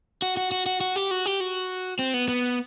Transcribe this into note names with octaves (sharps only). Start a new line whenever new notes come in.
F#4
F#4
F#4
F#4
F#4
G4
F#4
G4
F#4
C4
B3
B3